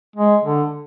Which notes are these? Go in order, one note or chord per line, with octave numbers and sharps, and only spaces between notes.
G#3
D3